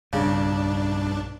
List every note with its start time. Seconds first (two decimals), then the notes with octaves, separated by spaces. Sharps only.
0.13 B1 G2 C#3 D4